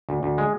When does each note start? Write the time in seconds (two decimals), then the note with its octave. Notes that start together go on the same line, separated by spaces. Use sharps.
0.09 D2
0.23 D2
0.38 G#3